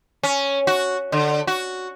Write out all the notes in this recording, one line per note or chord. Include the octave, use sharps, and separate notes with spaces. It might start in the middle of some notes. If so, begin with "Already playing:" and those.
C#4
F#4
D3
F#4